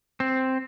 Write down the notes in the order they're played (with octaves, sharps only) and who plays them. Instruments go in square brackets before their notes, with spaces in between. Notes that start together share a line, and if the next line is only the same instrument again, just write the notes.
[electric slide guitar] C4